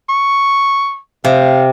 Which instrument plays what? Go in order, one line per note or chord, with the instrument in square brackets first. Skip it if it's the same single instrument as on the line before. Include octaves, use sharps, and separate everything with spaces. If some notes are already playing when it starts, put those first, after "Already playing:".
[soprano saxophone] C#6
[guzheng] C3 [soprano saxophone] F5